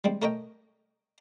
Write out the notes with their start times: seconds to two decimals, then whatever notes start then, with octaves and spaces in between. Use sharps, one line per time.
0.04 G3 G#3 C4
0.22 A3 A#4 C#5 D#5 G5